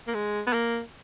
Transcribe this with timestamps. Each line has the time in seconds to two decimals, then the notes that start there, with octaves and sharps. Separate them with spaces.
0.07 A#3
0.14 G#3
0.47 B3
0.53 A#3